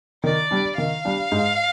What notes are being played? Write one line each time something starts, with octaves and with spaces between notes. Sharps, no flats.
D#3 D5
G3 D4
D#3 F5
G3 D4
G#2